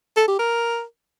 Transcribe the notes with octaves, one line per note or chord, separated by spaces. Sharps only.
A4
G4
A#4